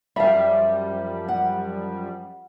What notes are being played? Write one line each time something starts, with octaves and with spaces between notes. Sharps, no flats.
F#2 F3 G3 E5 F5
F#5